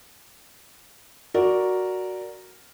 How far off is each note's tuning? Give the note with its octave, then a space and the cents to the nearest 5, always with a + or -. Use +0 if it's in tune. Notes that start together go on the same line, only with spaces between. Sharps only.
F#4 +0 A#4 +0 D5 +0